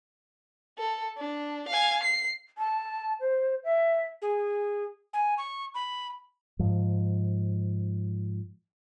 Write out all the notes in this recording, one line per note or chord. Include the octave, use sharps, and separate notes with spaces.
A4
D4
F5 G#5
C7
A5
C5
E5
G#4
G#5
C#6
B5
G#2 F3